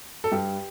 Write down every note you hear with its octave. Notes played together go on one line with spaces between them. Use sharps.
A4
G2 G4